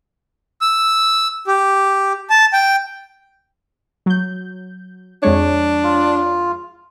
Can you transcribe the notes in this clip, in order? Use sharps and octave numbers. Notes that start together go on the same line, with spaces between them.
E6
G4
A5
G5
F#3 G6
F2 G#3 D4 C#5
F4